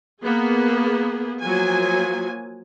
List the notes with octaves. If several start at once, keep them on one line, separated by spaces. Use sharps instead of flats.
A#3 B3 G#4
F3 F#3 A#3 G#5